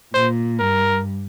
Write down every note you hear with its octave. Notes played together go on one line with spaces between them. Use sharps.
A#2 C5
G2 A#4